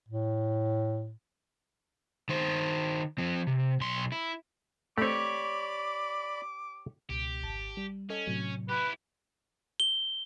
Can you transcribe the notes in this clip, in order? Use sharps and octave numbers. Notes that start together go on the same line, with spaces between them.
A2
D#3 C5
F3 C4
C3
B1 C6
E4
A3 C4 G4 C#5 D5 B5 D6
C#2 B2 G4
G#1 A5
G3
C#4 A4 D#5
A2 C3 F#3
E4 G4 B4
G7